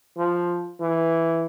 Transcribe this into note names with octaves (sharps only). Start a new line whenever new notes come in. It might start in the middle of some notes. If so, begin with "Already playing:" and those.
F3
E3